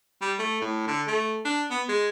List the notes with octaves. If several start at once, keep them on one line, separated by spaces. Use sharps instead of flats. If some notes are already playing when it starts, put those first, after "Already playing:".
G3
A3
A2
D3
A3
D4
B3
G#3